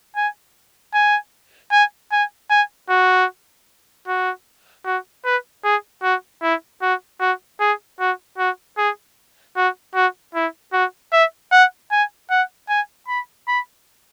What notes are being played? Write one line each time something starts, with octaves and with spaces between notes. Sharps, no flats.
G#5
G#5
G#5
G#5
G#5
F#4
F#4
F#4
B4
G#4
F#4
E4
F#4
F#4
G#4
F#4
F#4
G#4
F#4
F#4
E4
F#4
E5
F#5
G#5
F#5
G#5
B5
B5